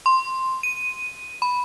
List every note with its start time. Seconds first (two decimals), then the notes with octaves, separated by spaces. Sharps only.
0.06 C6
0.63 D#7
1.42 B5